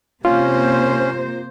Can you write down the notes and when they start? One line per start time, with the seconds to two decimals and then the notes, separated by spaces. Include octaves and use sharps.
0.25 C3 A#3 C#4 F4 C5